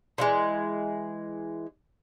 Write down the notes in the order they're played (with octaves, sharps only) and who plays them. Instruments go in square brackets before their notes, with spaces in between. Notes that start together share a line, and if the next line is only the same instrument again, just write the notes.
[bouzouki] D3 E3 G#3